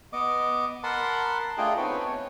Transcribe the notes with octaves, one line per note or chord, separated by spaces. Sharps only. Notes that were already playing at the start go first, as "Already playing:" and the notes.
B3 D#5 D6
A#4 F#5 A5 B5 C6
A3 D4 F4 G#4 D#5 G5
B3 C4 D#4 B4 C#5
C#5